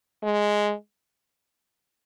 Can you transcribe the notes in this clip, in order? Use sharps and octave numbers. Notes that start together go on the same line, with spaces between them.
G#3